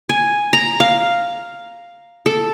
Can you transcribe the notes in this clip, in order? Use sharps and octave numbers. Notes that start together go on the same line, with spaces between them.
G#5
A#5
F5
A4